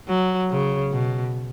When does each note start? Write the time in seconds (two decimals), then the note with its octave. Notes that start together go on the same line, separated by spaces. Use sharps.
0.08 F#3
0.50 C#3
0.92 B2